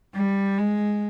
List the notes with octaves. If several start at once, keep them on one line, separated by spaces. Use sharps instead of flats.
G3
G#3